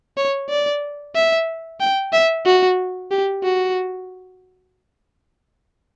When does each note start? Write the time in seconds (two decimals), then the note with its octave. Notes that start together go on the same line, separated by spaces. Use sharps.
0.17 C#5
0.49 D5
1.15 E5
1.80 G5
2.13 E5
2.46 F#4
3.11 G4
3.43 F#4